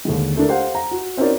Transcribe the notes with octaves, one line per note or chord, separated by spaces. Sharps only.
D#2 D3 G#3
A3 D4 A#4
G4 C5 F5 F#5
A#5
F#4
C4 C#4 D#4 F#4 A#4 D5